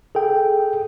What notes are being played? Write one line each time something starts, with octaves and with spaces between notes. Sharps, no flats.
G#4 A4 G5